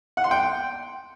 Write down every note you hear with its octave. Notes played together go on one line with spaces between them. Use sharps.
F#5
C6
G5